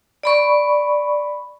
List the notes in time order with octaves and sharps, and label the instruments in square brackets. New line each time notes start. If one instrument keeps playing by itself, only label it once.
[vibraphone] D5 B5 C#6